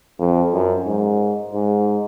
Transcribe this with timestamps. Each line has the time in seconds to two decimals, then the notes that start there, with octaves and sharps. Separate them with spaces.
0.20 F2
0.53 F#2
0.87 G#2
1.54 G#2